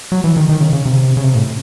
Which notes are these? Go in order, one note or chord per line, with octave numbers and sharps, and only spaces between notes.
F#3
E3
D#3
D#3
C#3
C#3
C3
C#3
C3
A2